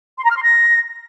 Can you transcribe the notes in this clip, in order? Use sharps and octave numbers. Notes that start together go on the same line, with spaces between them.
C6
A#5
F6
C6
A#6